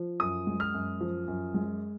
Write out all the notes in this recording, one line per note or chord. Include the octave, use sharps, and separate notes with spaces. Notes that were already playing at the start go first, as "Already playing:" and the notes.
Already playing: F3
F#2 D#6
G#3
F6
F#2
F3
F#2
G#3